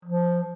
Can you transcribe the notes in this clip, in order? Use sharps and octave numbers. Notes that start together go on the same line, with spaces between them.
F3